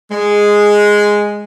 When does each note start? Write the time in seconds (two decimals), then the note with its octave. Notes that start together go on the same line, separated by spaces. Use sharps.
0.11 G#3